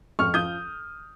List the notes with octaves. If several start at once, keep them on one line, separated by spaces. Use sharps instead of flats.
F2 C#6 F6
F3 D#6 G6